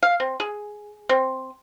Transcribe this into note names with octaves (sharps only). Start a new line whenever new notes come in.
F5
C4
G#4
C4